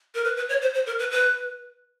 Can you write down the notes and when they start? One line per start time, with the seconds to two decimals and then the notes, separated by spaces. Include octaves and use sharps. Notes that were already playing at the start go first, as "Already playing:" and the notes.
0.15 A#4
0.24 B4
0.36 B4
0.49 C#5
0.62 C5
0.74 C5
0.86 A#4
0.99 B4
1.11 B4